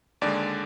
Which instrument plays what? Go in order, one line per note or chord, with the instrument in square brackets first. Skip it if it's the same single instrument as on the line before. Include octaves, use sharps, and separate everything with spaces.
[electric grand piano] D#2 D3 G#3 D5